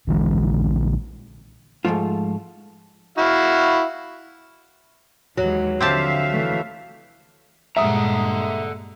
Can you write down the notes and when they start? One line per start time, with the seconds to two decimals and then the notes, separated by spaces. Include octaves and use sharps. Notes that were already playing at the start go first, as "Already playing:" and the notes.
0.07 A#1 D3 E3 G#3
1.85 G#2 E3 F3 A3 F4
3.18 E4 F#4 F5
5.38 D#2 E3 F#3 G#3
5.81 D3 F3 C4 G4 E5 F5 A5
6.32 E3 A3
7.77 G2 A#2 G#3 A4 E5 F#5 A#5 D#6